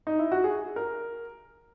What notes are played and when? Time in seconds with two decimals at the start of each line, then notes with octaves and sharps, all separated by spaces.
0.07 D#4
0.19 E4
0.32 F#4
0.44 G#4
0.76 A#4